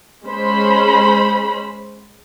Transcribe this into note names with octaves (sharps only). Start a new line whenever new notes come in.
G#3 C#4 C5 B5